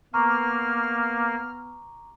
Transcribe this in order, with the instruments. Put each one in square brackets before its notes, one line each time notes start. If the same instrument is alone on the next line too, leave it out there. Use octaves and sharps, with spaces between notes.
[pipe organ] A#3 [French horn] B3 [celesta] A#5 C#6 D6 [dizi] F6